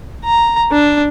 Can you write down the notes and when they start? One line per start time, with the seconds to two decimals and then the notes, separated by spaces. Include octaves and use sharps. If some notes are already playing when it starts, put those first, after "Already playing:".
0.24 A#5
0.72 D4